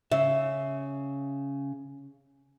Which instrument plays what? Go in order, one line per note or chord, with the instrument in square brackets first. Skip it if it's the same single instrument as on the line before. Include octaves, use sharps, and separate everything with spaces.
[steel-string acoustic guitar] C#3 [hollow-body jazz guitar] E5